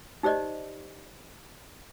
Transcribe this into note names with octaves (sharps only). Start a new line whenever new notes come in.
D#4 G4 C5 D5 D#5